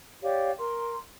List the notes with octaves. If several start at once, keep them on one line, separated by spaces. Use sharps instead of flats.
G4 C#5 D5 F5
A#4 C6